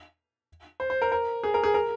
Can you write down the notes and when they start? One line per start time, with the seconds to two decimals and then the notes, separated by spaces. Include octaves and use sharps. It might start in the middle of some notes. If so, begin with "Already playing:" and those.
0.80 C5
0.90 C5
1.02 A#4
1.12 A#4
1.44 G#4
1.54 A#4
1.64 G#4
1.74 A#4